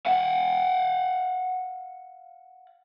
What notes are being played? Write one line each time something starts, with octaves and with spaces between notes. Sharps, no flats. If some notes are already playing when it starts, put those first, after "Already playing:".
F5 F#5